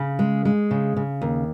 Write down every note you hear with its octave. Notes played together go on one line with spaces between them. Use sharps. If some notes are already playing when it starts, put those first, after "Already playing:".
Already playing: C#3
G#3
G#3
C#3
C#3
D#2